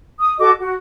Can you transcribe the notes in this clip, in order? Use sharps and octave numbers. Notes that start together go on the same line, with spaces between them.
D#6
F#4 A4 D#5 D6
F#4